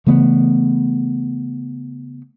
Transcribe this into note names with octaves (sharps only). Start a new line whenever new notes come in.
C#3 E3 A3 B3